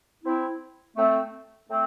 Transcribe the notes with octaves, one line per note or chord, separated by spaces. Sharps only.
C4 E4
A3 C4
A3 C4